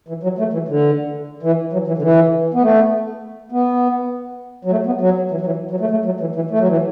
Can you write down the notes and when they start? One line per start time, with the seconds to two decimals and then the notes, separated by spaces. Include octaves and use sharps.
0.08 E3
0.23 F#3
0.39 A3
0.53 E3
0.68 D3
1.43 E3
1.73 F#3
1.87 E3
1.98 D3
2.02 E3
2.54 B3
2.62 A3
3.52 B3
4.65 F#3
4.71 A3
4.86 B3
5.01 F#3
5.31 E3
5.41 F#3
5.46 E3
5.71 F#3
5.80 A3
5.91 A3
6.05 F#3
6.20 E3
6.35 E3
6.50 A3
6.59 F#3
6.68 E3